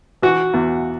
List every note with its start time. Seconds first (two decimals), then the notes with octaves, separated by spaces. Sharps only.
0.22 E3 F#4
0.54 E2